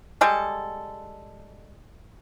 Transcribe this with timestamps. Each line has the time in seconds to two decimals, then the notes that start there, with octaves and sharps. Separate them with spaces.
0.21 G3 G#3 A4